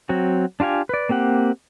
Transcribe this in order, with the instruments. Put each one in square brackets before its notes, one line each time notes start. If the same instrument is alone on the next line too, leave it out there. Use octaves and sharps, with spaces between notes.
[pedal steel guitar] F#3 C4 F#4
D4 F4 G4 F5 G#5
B4 D5
A#3 C4 G4 F#5